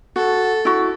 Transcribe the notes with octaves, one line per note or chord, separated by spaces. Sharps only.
F#4 A4
E4 F#4